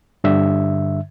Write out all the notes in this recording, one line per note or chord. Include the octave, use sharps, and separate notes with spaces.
G2 D3 E5